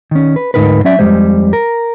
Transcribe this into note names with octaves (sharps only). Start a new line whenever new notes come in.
D#3 C#4
B4
D2 G#2 B2 D#4 A#4 B4
F#3 C#4 D5 E5
F2 C3 G3 G#3 C5
A#4